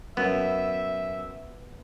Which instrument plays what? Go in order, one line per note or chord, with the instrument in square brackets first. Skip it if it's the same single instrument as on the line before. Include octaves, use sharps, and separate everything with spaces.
[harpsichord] F#2 [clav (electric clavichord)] B3 [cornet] E5